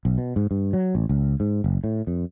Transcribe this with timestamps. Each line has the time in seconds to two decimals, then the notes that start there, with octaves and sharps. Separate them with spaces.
0.05 B1
0.18 B2
0.36 G#2
0.51 G2
0.73 F#3
0.95 A1
1.09 C#2
1.40 G#2
1.64 F#1
1.84 A2
2.07 F2